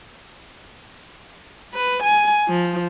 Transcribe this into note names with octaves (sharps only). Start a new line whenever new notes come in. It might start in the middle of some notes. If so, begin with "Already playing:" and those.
B4
G#5
F3